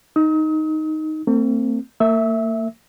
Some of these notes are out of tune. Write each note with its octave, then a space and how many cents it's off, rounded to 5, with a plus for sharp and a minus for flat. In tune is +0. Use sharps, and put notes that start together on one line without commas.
D#4 +0 D#6 +40
A3 +45 C4 +0
A#3 -40 E5 +0 E6 -30